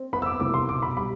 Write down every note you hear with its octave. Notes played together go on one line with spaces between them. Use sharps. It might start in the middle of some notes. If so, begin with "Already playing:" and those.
Already playing: C4
B3 B5
E6
D6
C2 D6
C6
B2 D6
B5
G3 B5